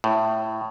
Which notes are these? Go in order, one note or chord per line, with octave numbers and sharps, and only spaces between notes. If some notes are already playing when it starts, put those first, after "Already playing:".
A2